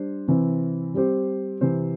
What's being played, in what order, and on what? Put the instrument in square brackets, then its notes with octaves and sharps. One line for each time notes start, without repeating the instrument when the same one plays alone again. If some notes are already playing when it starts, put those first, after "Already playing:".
Already playing: [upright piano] G3 D4 C5
C3 E3 C4
G3 C4 G4 C5
C3 E3 C4 G4 C5